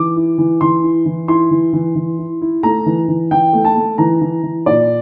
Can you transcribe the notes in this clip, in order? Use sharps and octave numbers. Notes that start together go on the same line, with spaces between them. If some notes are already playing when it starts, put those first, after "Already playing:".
Already playing: E3 D6
E4
E3
E3 C6
E4
E3
E4 C6
E3
E3
E3
E4
E4
A3 A#5
E3
E3
E3 G5
A3
A5
A3
E3 A#5
E3
E3
A#2 D5